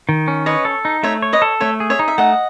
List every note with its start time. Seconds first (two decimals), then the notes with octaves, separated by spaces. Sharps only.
0.09 D#3
0.28 C#4
0.46 B4 C#5 D#5
0.65 A4
0.85 D#4
1.03 A3 C#5 E5
1.22 C#5
1.33 B4 D#5
1.42 A4
1.60 A3 C#5 E5
1.80 G#4
1.90 C#5 E5
1.99 D#4
2.08 E5
2.18 A3 D#5 F#5